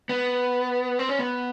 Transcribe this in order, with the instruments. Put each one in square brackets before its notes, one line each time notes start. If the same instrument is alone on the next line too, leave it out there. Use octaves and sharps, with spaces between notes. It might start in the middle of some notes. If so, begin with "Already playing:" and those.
[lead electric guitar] B3
C4
C#4
B3